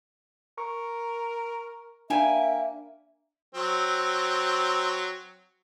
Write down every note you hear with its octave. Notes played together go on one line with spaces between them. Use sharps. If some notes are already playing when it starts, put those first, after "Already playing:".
A#4 C#6
A#3 D4 E5 G5 G#5 B5
F#3 C4